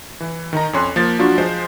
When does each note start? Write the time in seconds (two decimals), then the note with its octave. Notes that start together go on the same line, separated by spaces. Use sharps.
0.20 E3
0.53 D#3 D#4 A#5
0.73 F2 C#4 C#5 C6 F#6
0.96 F3 A#3 A6
1.19 F3 F#3 D4 F4 F#4
1.38 F3 G#3 C5